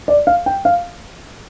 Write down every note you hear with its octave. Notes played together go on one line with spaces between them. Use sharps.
D5
F5
G5
F5